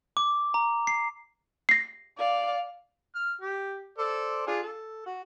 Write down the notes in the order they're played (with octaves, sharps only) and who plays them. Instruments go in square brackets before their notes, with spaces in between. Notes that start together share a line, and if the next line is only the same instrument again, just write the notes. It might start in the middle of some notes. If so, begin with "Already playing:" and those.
[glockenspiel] D6
A#5
C7
[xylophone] A#6 C7
[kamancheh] D5 F5
[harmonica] F6
G4
A4 C5 D5
D4 F4 G#4
A4
F#4